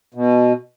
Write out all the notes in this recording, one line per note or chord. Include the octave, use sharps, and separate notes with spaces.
B2